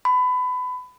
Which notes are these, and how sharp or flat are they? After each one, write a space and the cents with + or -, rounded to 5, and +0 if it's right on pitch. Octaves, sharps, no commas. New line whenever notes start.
B5 +25